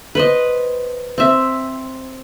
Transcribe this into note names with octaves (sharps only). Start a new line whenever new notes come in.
B4 C5 D#5
C4 E5